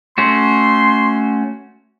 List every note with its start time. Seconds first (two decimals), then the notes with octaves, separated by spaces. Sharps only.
0.18 A3 C#4 F#4 C6